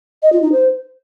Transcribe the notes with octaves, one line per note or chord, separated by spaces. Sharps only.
D#5
F4
D#4
C5